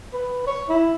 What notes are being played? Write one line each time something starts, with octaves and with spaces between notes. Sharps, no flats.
B4
C#5
E4